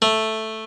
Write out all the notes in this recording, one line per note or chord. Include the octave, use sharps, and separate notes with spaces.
A3